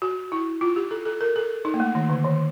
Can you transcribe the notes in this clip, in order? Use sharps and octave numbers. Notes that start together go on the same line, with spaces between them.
F#4
E4
F4
G4
A4
A4
A#4
A4
D#4
A#3
A3
D#3
D3
D#3